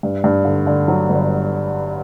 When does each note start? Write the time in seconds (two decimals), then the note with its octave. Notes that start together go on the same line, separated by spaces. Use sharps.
0.03 G2
0.24 G2
0.45 D3
0.67 D3
0.88 F#3
1.09 G1